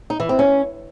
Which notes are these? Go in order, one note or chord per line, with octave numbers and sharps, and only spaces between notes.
D#4
E3
C4
C#4